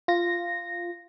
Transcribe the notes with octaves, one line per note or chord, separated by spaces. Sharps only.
F4 A#6